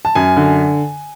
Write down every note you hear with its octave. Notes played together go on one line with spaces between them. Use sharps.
A5
F#2 G#5
D3